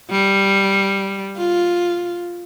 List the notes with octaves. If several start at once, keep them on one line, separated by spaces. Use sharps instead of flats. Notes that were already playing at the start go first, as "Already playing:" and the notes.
G3
F4